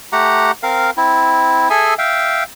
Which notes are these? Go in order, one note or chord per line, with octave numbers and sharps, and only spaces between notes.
A3 G4 F#5 A#5
C4 A#4 F5
C4 E4
G#4 A4 E5 G#5
E5 F5 G5